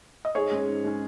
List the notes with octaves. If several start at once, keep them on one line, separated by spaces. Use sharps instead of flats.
D#5
G#2 G#4 C#5
G#3 C#4
G#2
G#3 C#4